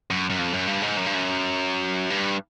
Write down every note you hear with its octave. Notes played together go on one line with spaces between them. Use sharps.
F#2
F#2
F2
F#2
G2
G#2
F#2
G2
F#2
G2